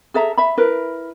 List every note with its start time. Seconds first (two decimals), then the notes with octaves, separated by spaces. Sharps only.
0.14 G#4 A4 E5 A#5
0.37 E5 B5
0.58 E4 A#4 B4